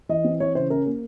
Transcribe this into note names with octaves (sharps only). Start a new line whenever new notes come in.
E3 D#5
C4
E3 C#5
C#3 C5
C#4 A#4
A#3